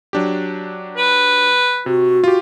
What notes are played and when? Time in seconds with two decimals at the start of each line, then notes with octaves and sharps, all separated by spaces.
0.13 F#3 D4 G4
0.97 B4
1.86 C3 F#4
2.24 F4 G4